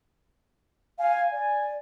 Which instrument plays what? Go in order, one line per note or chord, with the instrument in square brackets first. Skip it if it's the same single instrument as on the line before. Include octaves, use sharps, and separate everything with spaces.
[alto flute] F5 [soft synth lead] G#5
[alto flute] D5